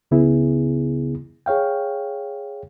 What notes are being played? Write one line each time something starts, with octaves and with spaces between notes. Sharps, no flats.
C#2 C#3 B3 E4 G#4
G#4 C#5 F5 G5